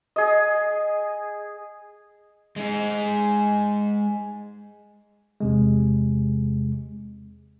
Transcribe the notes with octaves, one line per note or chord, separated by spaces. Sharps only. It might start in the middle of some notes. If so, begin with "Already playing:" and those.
G#4 D#5
G#3 D#4
E2 C3 G#3